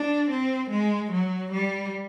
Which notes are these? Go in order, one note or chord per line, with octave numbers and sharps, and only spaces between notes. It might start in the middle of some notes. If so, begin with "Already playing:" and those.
Already playing: D4
C4
G#3
F#3
G3